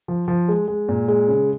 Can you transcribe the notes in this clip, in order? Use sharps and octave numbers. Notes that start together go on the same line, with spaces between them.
F3
F3
G#3
G#3
A#2
G#3
C#3